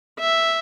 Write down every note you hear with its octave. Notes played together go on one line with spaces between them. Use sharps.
E5